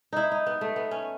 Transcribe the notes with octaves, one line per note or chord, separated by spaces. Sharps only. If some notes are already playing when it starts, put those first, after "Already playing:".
D#4 E4
D#4
B3
A3
B3
C#4